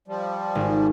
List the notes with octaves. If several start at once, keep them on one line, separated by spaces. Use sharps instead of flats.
F3 G3
G#1